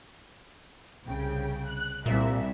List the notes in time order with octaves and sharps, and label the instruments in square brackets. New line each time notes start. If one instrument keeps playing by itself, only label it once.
[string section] C2 C#3 G5
F#6
[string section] C2 E5 [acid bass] A#2